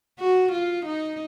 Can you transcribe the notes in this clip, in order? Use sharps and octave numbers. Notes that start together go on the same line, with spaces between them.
F#4
F4
D#4